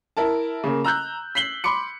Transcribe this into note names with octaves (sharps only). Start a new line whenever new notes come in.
E4 A#4 A5
C#3 A#3
A#5 E6 F#6 G6
B6 C7 F#7 G7
B5 C6 D6 C#7